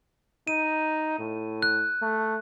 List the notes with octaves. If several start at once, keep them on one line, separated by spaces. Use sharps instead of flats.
D#4 D#7
A2
F#6
A3